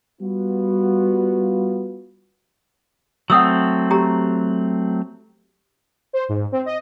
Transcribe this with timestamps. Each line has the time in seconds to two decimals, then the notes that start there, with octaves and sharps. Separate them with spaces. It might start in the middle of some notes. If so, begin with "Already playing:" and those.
0.21 G3 B3 F4 F#4
3.30 F#3 A3 C4 F#5 D#6 E6
3.91 G4 A#5
6.13 C5
6.29 G#2
6.52 C4
6.66 D#5